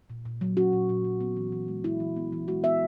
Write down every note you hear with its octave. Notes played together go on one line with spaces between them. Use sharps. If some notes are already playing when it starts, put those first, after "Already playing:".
A#2
A#2
F#3
C#4 F#4
A#2
A#2
F#3
B3
E3
E3
G#3
G#3 E4
E3
B3
E3
G#3 F#4
B3 E5